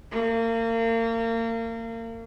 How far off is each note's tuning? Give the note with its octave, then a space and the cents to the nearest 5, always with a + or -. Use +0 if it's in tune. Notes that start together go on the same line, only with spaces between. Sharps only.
A#3 -35